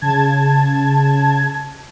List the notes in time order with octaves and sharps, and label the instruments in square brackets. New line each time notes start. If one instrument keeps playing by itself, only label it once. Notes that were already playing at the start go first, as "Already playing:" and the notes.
[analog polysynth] C#3 A5 G#6